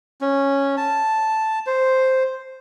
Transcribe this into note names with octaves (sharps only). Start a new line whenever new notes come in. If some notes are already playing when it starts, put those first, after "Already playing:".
C#4
A5
C5